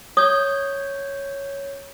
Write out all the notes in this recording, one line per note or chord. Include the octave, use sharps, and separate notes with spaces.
C#5 D#6 G6